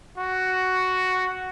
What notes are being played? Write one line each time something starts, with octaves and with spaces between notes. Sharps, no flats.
F#4